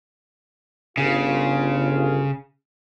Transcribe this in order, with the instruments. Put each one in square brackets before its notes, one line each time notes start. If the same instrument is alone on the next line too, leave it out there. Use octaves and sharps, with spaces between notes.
[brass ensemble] G1 F4 [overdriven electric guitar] C#3